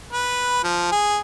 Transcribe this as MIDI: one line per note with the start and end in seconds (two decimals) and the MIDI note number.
0.13 0.61 71
0.64 0.87 53
0.92 1.19 68